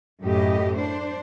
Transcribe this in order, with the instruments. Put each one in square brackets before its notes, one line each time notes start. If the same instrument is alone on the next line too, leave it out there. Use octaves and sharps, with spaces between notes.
[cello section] F#2 A2 G4 D#5
D4 C5